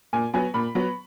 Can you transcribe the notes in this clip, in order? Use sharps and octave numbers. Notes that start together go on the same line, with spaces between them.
A#2 G#5
F#3 B3 G#5
A#2 B5
F#3 B3